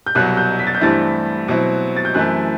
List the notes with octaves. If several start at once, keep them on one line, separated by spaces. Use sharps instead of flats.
G6
C2 B2 F#3 F#6
G6
B6
A6
G6
G2 E3 A3 C4 E4 A6
B2 F#3 C4 E4
A6
G6
F#2 E3 A3 C4 E4 F#6